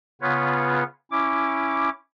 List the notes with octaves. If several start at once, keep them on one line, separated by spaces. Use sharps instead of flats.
C#3 B3 F4 B4 C#5
C#4 E4 D6